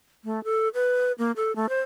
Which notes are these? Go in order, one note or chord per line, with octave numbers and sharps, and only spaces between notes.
A3
A4
B4
A#3
A4
A3
C5